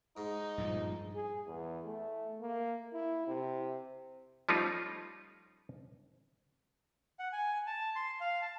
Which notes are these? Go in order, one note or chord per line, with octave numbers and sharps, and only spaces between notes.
G#2 D#4
G2 A#2 F3
G#4
E2
A3
A#3
E4
C3
F3 G3 A3 C#4 D#4 F4
F#5
G#5
A5
C6
F5
A5